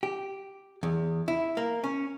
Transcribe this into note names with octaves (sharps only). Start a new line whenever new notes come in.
G4
E2
E4
A#3
C#4